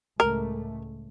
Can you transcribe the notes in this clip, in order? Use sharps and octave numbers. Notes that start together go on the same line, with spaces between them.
C#2 A2 A3 A#4